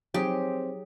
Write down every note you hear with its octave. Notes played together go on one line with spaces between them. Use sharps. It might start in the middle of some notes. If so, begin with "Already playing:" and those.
F#3 C4 D#4 G4 G#4